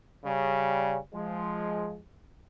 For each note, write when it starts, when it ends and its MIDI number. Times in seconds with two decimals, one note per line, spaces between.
0.24 0.98 49
0.24 0.98 55
1.14 1.99 53
1.14 1.99 56